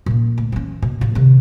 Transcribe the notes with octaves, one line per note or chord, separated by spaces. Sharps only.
A#2 C#4
D2
E3 C#4
B2
A1 A2
C3 D#3